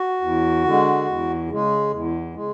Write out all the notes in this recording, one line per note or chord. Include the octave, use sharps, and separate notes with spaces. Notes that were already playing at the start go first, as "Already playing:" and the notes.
Already playing: F#4
E2
D3 G#3
E2
C#3 G#3
E2
C#3 G#3